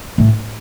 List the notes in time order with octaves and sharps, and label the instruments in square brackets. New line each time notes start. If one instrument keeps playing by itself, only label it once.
[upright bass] A2